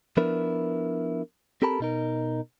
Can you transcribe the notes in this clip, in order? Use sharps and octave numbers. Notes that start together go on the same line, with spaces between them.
F3 B3 D4 E4 A#4 B4
C4 G4 A4 A#4 A5 B5
B2 D#4 A#4